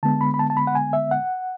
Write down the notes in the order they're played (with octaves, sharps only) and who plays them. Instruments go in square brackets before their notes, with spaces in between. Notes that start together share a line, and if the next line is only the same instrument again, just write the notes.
[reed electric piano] D3 G#3 B3 A5
B5
B5
A5
A5
B5
F#5
G#5
E5
F#5